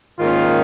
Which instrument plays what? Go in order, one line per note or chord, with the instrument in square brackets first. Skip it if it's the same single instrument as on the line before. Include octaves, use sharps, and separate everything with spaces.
[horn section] G#2 D#3 A#3 C#4 F4